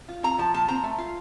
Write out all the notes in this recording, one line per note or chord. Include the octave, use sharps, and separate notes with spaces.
F4
C4 A#5
F3 A5
A#2 A5
C4 A#5
A3
F4